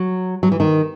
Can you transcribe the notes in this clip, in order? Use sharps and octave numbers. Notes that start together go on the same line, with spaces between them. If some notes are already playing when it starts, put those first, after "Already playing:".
Already playing: F#3
F#3
E3
D#3